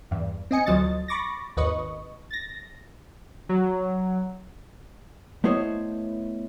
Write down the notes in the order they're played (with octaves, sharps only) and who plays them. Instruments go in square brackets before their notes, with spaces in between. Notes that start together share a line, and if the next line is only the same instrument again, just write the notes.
[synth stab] E2 G2
C4 D#5 G#5 C#7
D2 F3 F#3 D#5 A6
B5 C#6 D6 A6 A#6
G#1 D#2 B4 D#5 C#6
A6 A#6
[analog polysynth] F#3
[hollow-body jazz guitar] A3 B3 E4 C5 C#5 D#5